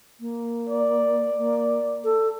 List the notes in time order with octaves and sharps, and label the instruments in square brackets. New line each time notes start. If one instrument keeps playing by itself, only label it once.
[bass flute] A#3
[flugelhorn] D5
[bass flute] A#3
A4